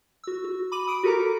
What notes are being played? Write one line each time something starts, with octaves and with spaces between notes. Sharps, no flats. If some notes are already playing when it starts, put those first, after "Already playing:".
F#4 E6
F#4
B5 D6 D#7 F#7
B5 D#6 D7 D#7
F#4 G4 A4 A#4 A#5 D6